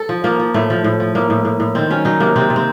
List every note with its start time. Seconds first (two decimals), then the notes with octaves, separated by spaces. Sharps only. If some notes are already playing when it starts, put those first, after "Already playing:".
Already playing: A4
0.09 F3
0.24 F3 A#3
0.39 F3
0.54 A2 A3
0.70 F3
0.84 A2
1.00 F3
1.15 A2 A#3
1.30 A2
1.45 A2
1.60 A2
1.75 D#3 C4
1.90 F#3 C#4
2.05 F#3 D#4
2.20 C3 A#3
2.36 C3 C4
2.50 C3
2.56 C4